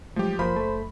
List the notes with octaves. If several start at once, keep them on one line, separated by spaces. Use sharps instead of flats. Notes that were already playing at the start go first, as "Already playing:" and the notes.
F3 F#3 G#3 A3 G4
F#1 F3 A#3 C5 B5
A3